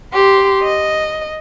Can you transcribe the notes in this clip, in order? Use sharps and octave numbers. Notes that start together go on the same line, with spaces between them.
G4 C6
D#5